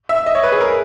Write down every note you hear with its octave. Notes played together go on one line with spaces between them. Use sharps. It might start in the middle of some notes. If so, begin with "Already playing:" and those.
E5
D#5
C#5
B4
G#4
A#4